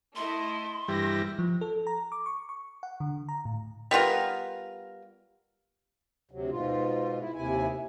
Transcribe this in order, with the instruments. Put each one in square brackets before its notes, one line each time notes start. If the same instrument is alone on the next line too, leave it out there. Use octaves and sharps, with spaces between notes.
[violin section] A3 E4 D#5 [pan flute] C6
[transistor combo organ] G2 E3 G3 [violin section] A#6
[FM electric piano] F3
A4
A#5
D6
C#6
C#6
F#5
D3
A#5
A2
[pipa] G3 B3 F4 A#4
[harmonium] D2 C3 F#3
G#2 B2 F4
E4
D#2 C3 E4 G#5